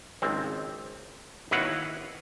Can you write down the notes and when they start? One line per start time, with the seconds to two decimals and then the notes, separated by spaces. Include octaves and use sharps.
0.22 G#1 C#2 C4
1.51 D#2 E4 F#4 B4 F5 F#5